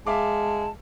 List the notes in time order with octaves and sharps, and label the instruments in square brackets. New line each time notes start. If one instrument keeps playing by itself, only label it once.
[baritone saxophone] G#3 [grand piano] E5 F5 D6 [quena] A5